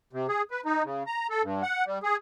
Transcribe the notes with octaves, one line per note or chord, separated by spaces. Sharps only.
C3
G#4
B4
D#4
C#3
A#5
A4
G2
F#5
G3
G#4